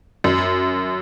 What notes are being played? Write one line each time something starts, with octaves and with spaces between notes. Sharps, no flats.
F#2